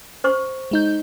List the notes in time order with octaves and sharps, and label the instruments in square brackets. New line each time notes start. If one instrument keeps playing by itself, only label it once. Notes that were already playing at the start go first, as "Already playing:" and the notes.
[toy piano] C5 C#6
[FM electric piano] G#3 D#4 G6